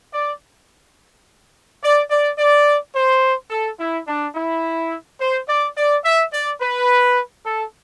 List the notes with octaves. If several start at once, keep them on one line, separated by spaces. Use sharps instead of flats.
D5
D5
D5
D5
C5
A4
E4
D4
E4
C5
D5
D5
E5
D5
B4
A4